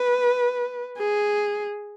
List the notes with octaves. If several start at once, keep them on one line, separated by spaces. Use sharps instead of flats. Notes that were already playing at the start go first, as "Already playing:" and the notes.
Already playing: B4
G#4